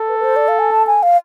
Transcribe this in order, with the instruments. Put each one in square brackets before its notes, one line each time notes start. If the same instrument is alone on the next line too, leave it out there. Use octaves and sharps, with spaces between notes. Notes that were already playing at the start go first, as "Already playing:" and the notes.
Already playing: [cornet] A4
[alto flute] B4
B4
C5
D5
F5
G#5
A5
G#5
F5